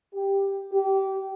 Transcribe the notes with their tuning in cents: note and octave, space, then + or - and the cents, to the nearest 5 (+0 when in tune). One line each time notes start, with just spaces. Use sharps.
G4 +10
G4 -25